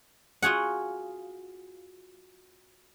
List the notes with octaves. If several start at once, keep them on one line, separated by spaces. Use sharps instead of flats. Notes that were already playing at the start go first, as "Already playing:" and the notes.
F4 F#4 G#4 F#5